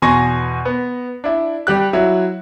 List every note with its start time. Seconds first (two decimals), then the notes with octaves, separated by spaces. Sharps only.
0.02 E2 B2 G#5 C6 C#6 A#6
0.65 B3
1.24 D4 E4
1.67 G3 G4 F#6
1.93 F#3 E4